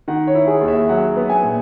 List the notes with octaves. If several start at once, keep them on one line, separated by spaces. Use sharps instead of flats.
D#3 F#5
C#5
E4
G#4
D#2
E5
F#3 F#5
B3
G#5
A#2